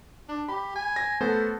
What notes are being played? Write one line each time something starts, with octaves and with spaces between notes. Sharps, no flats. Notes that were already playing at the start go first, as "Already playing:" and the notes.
D4
G4 B5
G#5
G#6 A#6
A3 B3 A4 C5